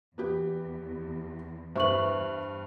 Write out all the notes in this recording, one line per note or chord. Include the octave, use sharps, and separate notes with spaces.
E2 B3 G4 B4
G2 E4 B4 C5 C#6 F#7